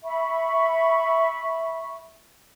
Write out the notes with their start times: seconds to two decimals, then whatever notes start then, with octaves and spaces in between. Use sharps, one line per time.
0.04 E5 B5 C#6